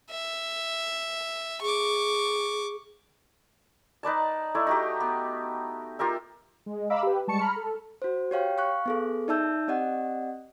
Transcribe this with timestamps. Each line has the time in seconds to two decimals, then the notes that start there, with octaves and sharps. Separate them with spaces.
0.10 E5
1.62 G#4 C#6 D6
4.03 D#4 B4 D5 A5
4.55 A3 E4 D5
4.67 D#4 F#4 G4
5.00 B3
5.99 F4 G4 A#4 E5
6.66 G#3
6.90 D#5 F5 A#5 B5 D6 E6
7.03 G4 B4
7.27 G3 G#3 A5 C#6 C#7
7.40 A#5 B5 F6
7.56 A4
8.02 F#4 C5
8.31 G4 C#5 F5 G5
8.58 F5 C#6 F#6
8.86 B3 G#4 A4
9.28 D#4 D5 E5 A5 E6 G6
9.68 C4 G4 D5 D#5 F#5